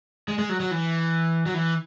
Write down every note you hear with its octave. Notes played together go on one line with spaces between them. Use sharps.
G#3
G#3
F#3
F#3
E3
F#3
E3